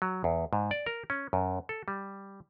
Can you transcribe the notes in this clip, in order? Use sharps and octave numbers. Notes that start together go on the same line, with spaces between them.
F#3
E2
G#2
D5
A#4
C#4
F#2
A4
G3